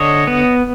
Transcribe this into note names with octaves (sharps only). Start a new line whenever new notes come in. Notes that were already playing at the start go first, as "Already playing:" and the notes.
Already playing: D3 C#5 D#5
B3